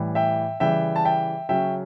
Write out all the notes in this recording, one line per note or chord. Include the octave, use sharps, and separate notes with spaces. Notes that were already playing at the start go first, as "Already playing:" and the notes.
Already playing: A2 E3 G3
E5 G5
C#3 E3 G3 E5 G5
A5
E5 G5
C#3 F#3 C#4 E5 G5